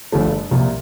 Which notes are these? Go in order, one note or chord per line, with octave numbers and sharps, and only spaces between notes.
G1 G2 F3 A3
C2 A#2 F3